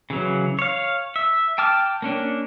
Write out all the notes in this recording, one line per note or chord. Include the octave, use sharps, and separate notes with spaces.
C#3 E3 F#3
C#5 F5
E5
G5 A5 D6 F6
A#3 C#4 D4